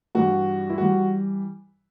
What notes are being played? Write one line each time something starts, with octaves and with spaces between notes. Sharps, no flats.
G2 E3 G3 F#4
E4
E3 G3 F#4